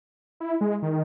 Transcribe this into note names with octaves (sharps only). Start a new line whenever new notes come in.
E4
G#3
D#3